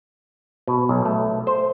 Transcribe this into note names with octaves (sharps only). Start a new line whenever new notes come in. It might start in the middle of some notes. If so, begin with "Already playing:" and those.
B2
B1
A3
C5